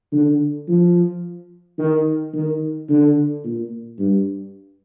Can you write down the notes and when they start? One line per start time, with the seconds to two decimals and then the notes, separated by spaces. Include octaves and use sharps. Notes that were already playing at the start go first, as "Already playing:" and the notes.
0.12 D3
0.68 F3
1.78 D#3
2.33 D#3
2.89 D3
3.44 A#2
3.99 G2